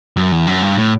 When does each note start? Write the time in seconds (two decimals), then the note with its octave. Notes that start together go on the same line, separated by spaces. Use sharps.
0.17 F#2
0.32 E2
0.47 F#2
0.62 G2
0.78 A2